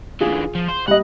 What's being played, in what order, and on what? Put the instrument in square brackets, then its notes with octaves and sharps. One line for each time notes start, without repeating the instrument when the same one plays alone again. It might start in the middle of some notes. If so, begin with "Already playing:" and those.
[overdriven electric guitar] D3 E3 [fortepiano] F4 G#4
[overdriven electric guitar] F3
C5
[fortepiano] G3 D#5 [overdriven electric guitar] F#5